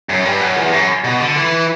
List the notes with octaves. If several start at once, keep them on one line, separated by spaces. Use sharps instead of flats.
F#2
G2
F#2
E2
F#2
B2
D3
E3